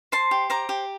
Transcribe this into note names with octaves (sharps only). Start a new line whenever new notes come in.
C5 A5 C6
G4
C5 A#5 D6
G4